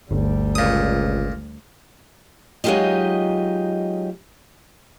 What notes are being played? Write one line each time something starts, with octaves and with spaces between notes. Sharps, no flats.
G1 D2 G3
C#2 A#2 D#6
F#3 G#3 D#4 F4 G4 D#5